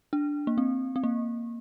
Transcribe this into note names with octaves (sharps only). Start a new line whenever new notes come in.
D4
A#3
C4
C4
A#3